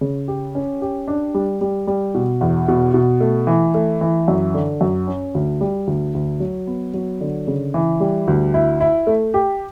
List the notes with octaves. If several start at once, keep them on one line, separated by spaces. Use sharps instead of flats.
C#3
G4
C#4
G4
D4
G3
G3
G3
B2
E2
B2
B2
A3
E3
A3
E3
F#2
D3
F#2
C#4
D2
G3
D2
D2
F#3
B3
F#3
D3
C#3
E3
G3
D2
E4
E4
A3
G4